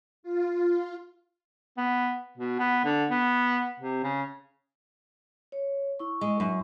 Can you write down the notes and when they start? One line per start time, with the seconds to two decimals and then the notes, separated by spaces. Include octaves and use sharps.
0.23 F4
1.77 B3
2.38 B2
2.60 B3
2.85 D3
3.10 B3
3.80 C3
4.03 C#3
5.52 C#5
6.00 E4 C#6
6.21 G#3
6.40 F#2